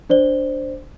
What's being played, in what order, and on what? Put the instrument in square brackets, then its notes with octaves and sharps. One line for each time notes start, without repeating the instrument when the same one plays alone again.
[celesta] D4 C5 D5 G7